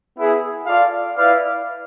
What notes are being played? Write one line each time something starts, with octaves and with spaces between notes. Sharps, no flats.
B3 E4 G#4
F4 A4 D5 F5
E4 B4 D5 F5